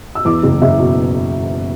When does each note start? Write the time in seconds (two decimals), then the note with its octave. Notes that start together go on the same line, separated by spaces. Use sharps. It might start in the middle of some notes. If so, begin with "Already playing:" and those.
0.15 E6
0.25 E2 D6
0.43 F#1
0.62 F#1 E5
0.79 B2